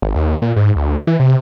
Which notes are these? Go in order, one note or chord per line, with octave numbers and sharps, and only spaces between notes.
G#1
D#2
A#2
G#2
D2
E3
C3